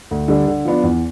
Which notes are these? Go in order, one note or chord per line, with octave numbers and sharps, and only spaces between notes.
D2
D3 G3 D4
D3
F3 B3 D4
E2